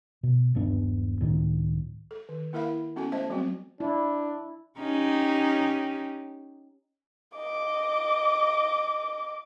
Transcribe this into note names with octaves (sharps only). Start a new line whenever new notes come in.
B2
D#1 G2 B3 D4
C#2 A2 D#3
A4
D#3
A#3 E4 A#4 E5 F5 B5
B3 C#4 F#4 A4 G#5
A3 C5 D#5 E5 A5
F#3 G3 B3 C4 F#4
D4 E4
C#4 D#4 G4
D#5 D6